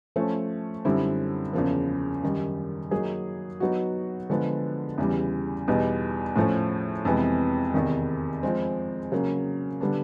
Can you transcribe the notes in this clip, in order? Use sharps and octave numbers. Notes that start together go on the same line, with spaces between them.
F3 A3 C#4
F#2 D3 G3 C4 E4
E2 C#3 F3 A#3
F#2 D#3 G3
F#3 A#3 D#4 G#4
F#3 B3 D#4 F#4
D3 F3 G#3 B3
E2 C#3 E3 G3
E2 B2 G3 B3 D#4
A2 F3 A3 C#4
F2 C3 E3 G#3 B3
E2 C3 D#3
F3 G#3 C4
C#3 F#3 A#3
D3 G3 B3 D4